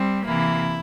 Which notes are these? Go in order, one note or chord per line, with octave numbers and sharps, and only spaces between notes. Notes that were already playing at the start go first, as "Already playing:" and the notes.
Already playing: G3 C4
C3 E3 A#3 E4